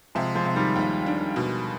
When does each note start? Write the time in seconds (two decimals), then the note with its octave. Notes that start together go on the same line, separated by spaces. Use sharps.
0.15 C3 F3 G#3
0.35 F3 G#3
0.45 C3
0.55 D#3 G3
0.75 D#2
1.06 D4
1.36 B2